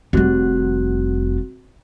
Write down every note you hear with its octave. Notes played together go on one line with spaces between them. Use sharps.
F1 G3 C4 F#4 F#6